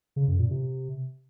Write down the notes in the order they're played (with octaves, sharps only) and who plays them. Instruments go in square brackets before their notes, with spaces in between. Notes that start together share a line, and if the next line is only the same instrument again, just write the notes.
[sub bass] C#3
F#2
A#2
C3